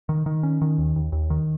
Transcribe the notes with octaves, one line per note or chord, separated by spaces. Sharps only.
D#3
D#3
C#4
D#3
D#2
D#2
D#2
D#3